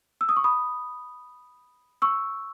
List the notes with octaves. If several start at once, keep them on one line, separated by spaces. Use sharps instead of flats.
E6
D#6
C#6
B5 D#6
C#6 E6